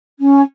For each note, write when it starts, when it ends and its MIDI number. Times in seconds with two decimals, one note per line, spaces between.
0.19 0.40 61